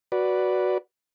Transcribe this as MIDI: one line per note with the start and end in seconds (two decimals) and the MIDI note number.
0.12 0.78 66
0.12 0.78 71
0.12 0.78 74